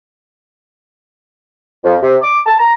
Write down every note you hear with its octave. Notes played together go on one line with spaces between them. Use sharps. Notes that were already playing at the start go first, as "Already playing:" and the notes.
F2
C3
D6
A5
A#5